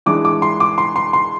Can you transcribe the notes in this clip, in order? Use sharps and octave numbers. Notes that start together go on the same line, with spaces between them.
E3 G#3 D4 D6
D6
C6
D6
C6
C6
C6